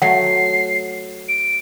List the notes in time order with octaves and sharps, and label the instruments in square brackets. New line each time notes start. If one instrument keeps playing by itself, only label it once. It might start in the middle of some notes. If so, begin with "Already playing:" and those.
[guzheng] F#3 A3 [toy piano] F#5 [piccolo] C7
[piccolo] D7